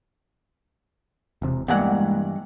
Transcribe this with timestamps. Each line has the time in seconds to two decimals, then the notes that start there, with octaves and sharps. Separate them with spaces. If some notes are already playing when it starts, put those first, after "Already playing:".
1.42 E1 C3
1.68 G2 E3 G#3 A#3 B3 F#5